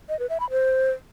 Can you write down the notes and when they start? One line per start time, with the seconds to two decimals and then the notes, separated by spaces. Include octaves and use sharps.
0.09 D#5
0.19 B4
0.30 E5
0.40 B5
0.50 C5